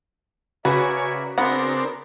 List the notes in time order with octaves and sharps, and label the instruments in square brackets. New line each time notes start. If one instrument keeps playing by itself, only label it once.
[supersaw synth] C#3 F#4 [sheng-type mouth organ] A#4 D5 E5 [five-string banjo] B4 [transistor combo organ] C#5 G#5
[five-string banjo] B3 F#5 [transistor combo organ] C4 D4 A#4 [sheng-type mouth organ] G#4